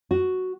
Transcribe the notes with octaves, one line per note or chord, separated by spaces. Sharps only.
F#4